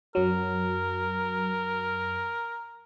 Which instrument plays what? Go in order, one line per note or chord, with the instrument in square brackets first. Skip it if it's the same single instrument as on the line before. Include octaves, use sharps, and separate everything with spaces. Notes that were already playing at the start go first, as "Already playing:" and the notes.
[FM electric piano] F#2 F#3 [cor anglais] A#4